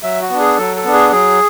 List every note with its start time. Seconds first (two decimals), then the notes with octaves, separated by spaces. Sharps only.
0.03 F#3 E5
0.22 F#4
0.30 B3 D4
0.40 G#4
0.58 F#3 A4
0.76 A4
0.85 B3 D4
0.93 G#4
1.12 F#3 G#4